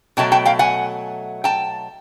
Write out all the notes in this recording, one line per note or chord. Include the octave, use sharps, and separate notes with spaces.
B2 F#3 A3 G5 A5
G5 A5
F5 G5
F#5 G#5
G5 A5